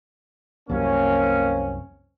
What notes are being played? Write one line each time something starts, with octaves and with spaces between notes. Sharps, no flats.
C2 F#2 C3 A#3 C4 C#4